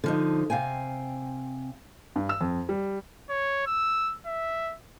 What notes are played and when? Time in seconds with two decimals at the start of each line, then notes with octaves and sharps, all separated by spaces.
0.04 D3 F3 D#4
0.50 C3 F5 G5 G#5
2.16 G2
2.29 E6
2.41 F2
2.69 G3
3.30 C#5
3.67 E6
4.26 E5